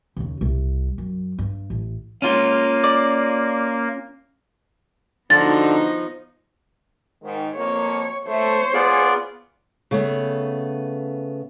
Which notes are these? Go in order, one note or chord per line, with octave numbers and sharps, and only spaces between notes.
D#2 C#3
C2
F#2
G2
A1
A#3 C#4 F4
D5
D3 F3 B3 D#4 F#4 A6
G#2 D#3 G#3
F2 A#3 C#5
A3 C5 C#5
B3 F4 G#4 D5
C#3 A3 B3